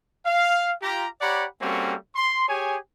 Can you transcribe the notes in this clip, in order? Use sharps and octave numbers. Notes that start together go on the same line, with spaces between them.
F5
F4 G4 A#5
G4 C#5 D5 F#5 A#5 B5
G3 A#3 C4 C#4 F#4 A4
C6
G4 G#4 C#5 G#5